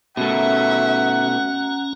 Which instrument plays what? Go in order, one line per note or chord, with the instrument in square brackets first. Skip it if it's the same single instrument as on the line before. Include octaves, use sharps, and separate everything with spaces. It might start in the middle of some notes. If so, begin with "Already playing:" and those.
[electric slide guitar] B2 A3 [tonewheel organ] C#4 A#5 [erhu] E5 [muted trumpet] F#5